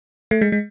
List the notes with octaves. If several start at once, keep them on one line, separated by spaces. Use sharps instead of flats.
A3
G#3
G#3